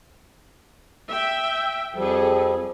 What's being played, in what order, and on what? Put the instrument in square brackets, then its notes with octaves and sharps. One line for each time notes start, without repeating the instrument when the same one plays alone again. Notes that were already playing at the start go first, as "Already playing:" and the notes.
[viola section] E5 G5
[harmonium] F2 F3 G3 [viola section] G#4 A4